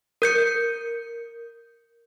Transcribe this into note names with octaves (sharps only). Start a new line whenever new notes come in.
A#4 G6 C#7